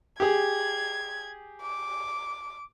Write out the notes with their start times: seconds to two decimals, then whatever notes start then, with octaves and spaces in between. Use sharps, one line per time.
0.20 G4 G#4 G#6
1.62 D6